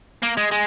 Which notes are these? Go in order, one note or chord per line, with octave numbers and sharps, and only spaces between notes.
A#3
G#3
G#3